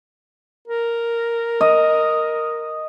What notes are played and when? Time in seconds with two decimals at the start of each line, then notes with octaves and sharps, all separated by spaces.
0.68 A#4
1.61 D#5